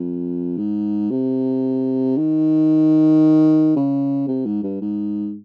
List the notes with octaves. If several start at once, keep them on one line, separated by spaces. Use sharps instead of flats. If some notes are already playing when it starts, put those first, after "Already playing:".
Already playing: F2
G#2
C3
D#3
C#3
C3
G#2
G2
G#2